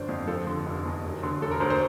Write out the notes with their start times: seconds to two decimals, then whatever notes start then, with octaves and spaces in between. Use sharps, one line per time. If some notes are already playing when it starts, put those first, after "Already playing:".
Already playing: G1 D3 F3 C5 D5
0.09 F2
0.27 F3 A4
0.47 D3
0.66 F1
0.85 E2
1.04 E1
1.23 D3
1.41 E1 A4
1.51 A#4
1.60 D2 C5
1.70 C5